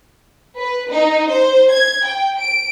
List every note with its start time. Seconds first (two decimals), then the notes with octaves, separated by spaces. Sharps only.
0.57 B4
0.90 D#4
1.29 C5
1.71 G#6
2.05 G5
2.37 D7